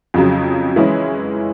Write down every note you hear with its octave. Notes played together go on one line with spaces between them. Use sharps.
F2 C#3 F#3
E3 G#3 C#4 E4